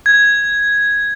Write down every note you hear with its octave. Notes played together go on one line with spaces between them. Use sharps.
G#6